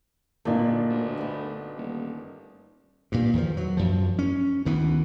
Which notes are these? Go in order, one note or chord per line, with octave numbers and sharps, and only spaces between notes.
D1 G1 A#2 A#3 D4 D#4
D2
A3 B3
D#1
G2 A#2
E2 D#3 F3
F#3
F#2 F3
C#4
D2 D#3 E3 B3